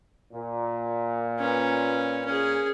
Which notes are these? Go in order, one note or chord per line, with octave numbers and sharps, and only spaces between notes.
A#2
C#4 B4
C#4 G#4